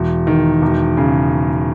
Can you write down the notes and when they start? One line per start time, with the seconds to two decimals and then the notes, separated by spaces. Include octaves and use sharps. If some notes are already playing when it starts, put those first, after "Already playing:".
Already playing: E1
0.27 D#3
0.62 E1
0.97 C#3